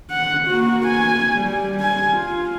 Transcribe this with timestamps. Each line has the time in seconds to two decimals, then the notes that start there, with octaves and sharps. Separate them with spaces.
0.11 F#5
0.48 A#3 F#4
0.87 G#5
1.34 G3
1.81 G#5
2.13 F4